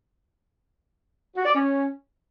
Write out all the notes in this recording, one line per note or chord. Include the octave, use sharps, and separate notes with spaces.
F#4
D5
C#4